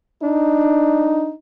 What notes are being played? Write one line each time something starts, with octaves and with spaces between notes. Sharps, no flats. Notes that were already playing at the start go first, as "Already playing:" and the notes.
D4 D#4